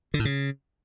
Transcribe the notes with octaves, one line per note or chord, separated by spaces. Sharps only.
D3
A2
C#3